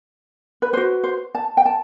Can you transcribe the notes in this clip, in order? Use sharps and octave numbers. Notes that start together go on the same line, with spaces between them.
B4
F#4 B4 C5
C5
A5
G5
A5